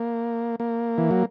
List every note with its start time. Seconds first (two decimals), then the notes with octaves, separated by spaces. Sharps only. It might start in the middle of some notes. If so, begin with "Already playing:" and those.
Already playing: A#3
0.60 A#3
0.98 E3
1.11 F#3